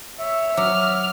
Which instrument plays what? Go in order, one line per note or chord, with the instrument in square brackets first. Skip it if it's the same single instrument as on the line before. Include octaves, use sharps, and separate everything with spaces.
[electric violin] C#5 [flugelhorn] E5
[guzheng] F#3 [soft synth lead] D6 [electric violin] F6